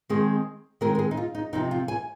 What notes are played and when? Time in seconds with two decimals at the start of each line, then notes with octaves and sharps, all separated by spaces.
0.09 D#3 G#3 C4 G#4
0.81 D#3 G#3 C4 A#4
0.95 A#4
0.99 G#4
1.11 D#4
1.17 F4
1.35 D#4
1.53 C3 F3 C4 D#4
1.71 F4
1.88 G#5